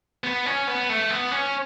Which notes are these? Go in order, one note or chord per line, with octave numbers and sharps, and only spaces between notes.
B3
C#4
B3
A3
B3
C#4